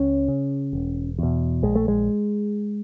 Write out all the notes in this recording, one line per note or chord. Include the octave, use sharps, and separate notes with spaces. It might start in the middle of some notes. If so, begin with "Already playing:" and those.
Already playing: C#2 C#4
C#3
E1
E2 B2
A#1 G#3
A3
G#3